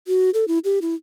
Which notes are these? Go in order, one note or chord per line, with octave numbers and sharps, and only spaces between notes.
F#4
A4
E4
G4
E4